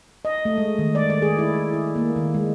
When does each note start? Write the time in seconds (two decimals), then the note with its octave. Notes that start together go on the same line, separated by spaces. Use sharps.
0.25 D#5
0.45 A3
0.58 G#3
0.79 D#3
0.95 D5
1.10 D5
1.22 G#4
1.38 E4
1.73 E4
1.96 A#3
2.16 D#3
2.34 G#3